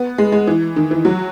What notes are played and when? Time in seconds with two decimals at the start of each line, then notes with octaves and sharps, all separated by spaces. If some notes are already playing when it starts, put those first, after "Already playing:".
Already playing: B3
0.18 G#3
0.32 G#3
0.47 E3
0.76 D#3
0.91 E3
1.05 F#3